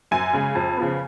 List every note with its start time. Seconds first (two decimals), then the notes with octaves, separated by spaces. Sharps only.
0.11 F#2 G#5
0.33 C#3 G#3
0.55 F2
0.77 C#3 F3 B3